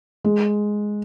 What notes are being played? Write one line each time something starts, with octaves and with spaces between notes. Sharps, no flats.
G#3